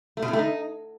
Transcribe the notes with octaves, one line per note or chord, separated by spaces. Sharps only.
A3
B2
A2
A3
D#4